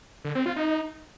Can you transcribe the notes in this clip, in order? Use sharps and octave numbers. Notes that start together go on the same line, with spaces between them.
D3
C4
F4
D#4